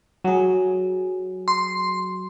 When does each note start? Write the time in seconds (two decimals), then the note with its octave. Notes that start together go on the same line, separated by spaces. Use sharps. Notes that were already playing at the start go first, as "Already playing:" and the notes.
0.24 F#3 G#4
1.48 C6